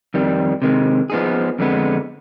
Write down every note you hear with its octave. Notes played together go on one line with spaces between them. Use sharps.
F2 D#3 G3
C3 D#3 G#3
F3 B3 D#4 G#4
F2 D3 G#3 B3